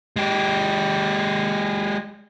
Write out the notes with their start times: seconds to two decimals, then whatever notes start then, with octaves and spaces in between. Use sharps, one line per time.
0.16 G#3 G4